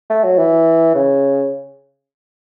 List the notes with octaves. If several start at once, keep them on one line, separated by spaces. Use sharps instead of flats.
A3
F#3
E3
C#3